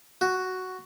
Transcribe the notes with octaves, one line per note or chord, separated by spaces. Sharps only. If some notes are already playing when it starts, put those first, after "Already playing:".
F#4